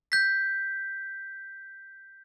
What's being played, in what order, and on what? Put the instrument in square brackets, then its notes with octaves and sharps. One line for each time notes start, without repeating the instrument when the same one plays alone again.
[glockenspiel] G6 B6